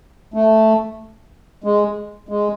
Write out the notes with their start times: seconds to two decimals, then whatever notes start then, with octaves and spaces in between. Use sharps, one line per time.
0.34 A3
1.64 G#3
2.29 G#3